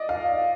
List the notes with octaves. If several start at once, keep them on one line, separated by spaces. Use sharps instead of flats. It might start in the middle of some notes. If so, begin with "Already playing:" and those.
Already playing: D5 D#5
F5